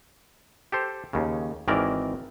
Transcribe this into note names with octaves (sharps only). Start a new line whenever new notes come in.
G4 A4 C5
D#2 C#3
G#1 D#3 E3 A#4 D5